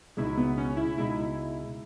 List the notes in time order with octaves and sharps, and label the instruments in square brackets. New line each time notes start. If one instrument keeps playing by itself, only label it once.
[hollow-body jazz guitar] C#2 B2 G#3 D#4 [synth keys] E4
[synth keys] B3
C#4
E4
[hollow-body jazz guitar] C#2 B2 G#3 D#4 [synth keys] E4